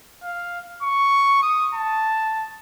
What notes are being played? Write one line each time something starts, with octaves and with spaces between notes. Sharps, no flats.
F5
C#6
D#6
A5